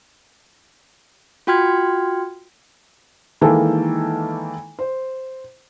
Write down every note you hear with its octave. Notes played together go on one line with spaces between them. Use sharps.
F4 F#4 G5 C6 F6 G#6
D#3 E3 G#3 A#3 A4
C5